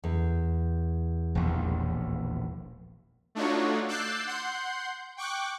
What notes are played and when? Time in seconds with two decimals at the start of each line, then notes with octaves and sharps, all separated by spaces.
0.04 E2
1.35 E1 A#1 D#2
3.35 A3 D4 D#4 F4 F#4 C#5
3.87 D6 E6 F#6 G6 A6 C7
4.27 F#5 C6 G6
5.17 G5 C#6 D6 F#6